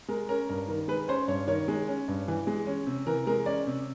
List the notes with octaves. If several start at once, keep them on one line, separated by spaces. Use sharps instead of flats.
G#3 A#4
C#4 A#4
G2 A#4
D#3 A#4
G#3 B4
C#4 C5
G2 C#5
D#3 C#5
G#3
C#4
G2
E3
G#3
C#4
C3
E3 A#4
G#3 A#4
C#4 D5
C3